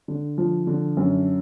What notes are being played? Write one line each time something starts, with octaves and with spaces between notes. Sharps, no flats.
D3
F3
D3
F#2